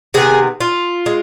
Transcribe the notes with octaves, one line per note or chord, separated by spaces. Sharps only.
C3 D#3 B3 G#4
F4
G#3